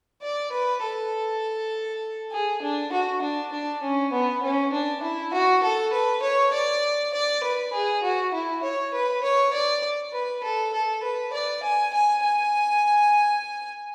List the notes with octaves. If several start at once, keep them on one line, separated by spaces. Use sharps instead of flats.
D5
B4
A4
G#4
D4
F#4
D4
D4
C#4
B3
C#4
D4
E4
F#4
A4
B4
C#5
D5
D5
B4
G#4
F#4
E4
C#5
B4
C#5
D5
B4
A4
A4
B4
D5
G#5
G#5
G#5